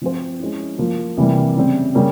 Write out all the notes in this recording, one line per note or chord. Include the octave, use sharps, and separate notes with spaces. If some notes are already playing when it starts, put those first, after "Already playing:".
F3 C4 F4 C5
G#3 C#4 E4
F3 A#3 F4
C3 E3 G3 A#3
C#3 G3 C4
C#3 G3 A#3 C#4